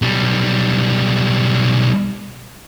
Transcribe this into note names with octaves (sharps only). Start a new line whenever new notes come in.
B1 G3